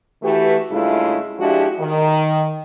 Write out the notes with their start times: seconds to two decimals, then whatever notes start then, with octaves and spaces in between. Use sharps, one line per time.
0.23 E3 A3 F#4 G4 B4
0.72 G2 C#3 G#3 A3 E4 F4
1.40 F3 G#3 D4 E4 F#4 G4
1.80 D#3